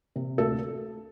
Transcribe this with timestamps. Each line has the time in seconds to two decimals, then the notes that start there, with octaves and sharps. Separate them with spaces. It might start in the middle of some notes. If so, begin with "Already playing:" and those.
0.16 C3
0.38 D2 A4